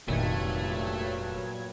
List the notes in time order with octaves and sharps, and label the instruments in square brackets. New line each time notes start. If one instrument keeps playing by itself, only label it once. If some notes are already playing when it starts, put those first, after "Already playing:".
[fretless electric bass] F1 D#3 [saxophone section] G2 F#3 [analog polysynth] A#2 G#6 [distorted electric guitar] A3